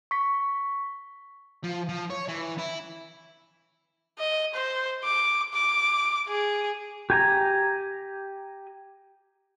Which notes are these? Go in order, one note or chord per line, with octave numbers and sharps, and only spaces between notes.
C#6 B6
F3
F3
C#5
E3
E4
D#5
C5
D6
D6
G#4
G4 G#5 A#5